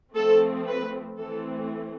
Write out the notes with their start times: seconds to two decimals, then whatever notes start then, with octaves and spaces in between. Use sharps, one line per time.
0.15 F3 A3 C4 A4
0.67 B4
1.18 E3 A3 C4 A4